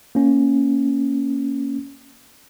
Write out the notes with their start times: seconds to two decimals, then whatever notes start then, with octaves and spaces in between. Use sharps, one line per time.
0.15 A#3 C#4